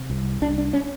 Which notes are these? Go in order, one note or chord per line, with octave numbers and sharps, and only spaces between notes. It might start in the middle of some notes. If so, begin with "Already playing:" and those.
Already playing: C3
C2
C2 D4
D4
C#4